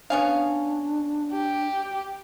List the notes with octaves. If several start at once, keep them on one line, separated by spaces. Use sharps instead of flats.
B3 C#4 D4 F5
G4